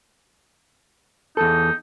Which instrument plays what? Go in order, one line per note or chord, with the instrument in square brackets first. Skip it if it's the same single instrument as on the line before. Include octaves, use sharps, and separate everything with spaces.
[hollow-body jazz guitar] E2 A4 [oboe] D#4